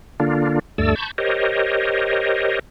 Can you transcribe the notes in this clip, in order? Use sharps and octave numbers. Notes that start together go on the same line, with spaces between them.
D3 A#3 D4 F4
D2 G2 A3 A4 D5 E6
A5 B5 C#6 G6
G4 A#4 C5 C#5 D#5